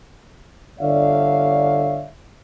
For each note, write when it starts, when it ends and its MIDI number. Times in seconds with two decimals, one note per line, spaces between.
0.80 2.05 31
0.80 2.05 50
0.80 2.05 73
0.80 2.05 74
0.80 2.05 76
0.80 2.05 77